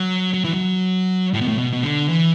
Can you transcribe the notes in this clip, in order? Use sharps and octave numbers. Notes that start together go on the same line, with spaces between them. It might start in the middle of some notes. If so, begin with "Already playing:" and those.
Already playing: F#3
F#3
E3
F#3
A2
B2
A2
B2
B2
D3
E3